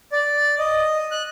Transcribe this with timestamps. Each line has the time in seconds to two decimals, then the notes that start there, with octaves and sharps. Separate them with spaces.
0.12 D5
0.59 D#5
1.11 F#6